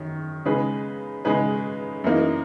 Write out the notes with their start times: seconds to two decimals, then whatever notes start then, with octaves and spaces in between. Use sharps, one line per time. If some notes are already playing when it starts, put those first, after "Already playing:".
Already playing: F#2 D#3 F#3 C#4
0.46 C#3 G#3 D#4 G#4 B4
1.25 C#3 G#3 D#4 G#4 B4
2.04 F#2 E3 A#3 D#4